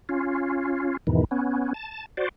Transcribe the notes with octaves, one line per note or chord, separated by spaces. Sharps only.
C#4 F4
E2 G#2 B2 D#3 E3
B3 C#4
A5
F#4 C5 D5